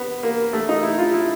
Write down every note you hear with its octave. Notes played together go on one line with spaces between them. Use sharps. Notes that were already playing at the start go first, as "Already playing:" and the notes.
Already playing: B3
A#3
A3
D#4
E4
F4
E4